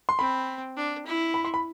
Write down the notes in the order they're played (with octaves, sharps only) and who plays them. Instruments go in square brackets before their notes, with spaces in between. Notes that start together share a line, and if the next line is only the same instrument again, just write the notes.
[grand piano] C6
[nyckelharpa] C4 [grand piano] B5
[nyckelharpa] D4
E4
[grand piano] B5
C6
B5